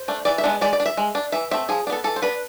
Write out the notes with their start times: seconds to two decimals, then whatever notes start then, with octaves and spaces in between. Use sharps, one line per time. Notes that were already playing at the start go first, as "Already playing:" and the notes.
Already playing: C5
0.08 A3 D4
0.25 E3 D5
0.38 E5
0.44 G#3 B3 D4
0.61 G#3 D5
0.73 D5
0.80 D4
0.86 E5
0.97 G#3
1.15 D4
1.32 E3 E5
1.51 A3 C4 E5
1.69 F3 G#4
1.87 D4
1.90 B3 A4
2.04 E3 A4
2.16 C5
2.22 B3 D4 B4